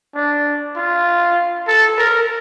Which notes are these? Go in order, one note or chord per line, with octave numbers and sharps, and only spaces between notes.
D4
F4
A4
A#4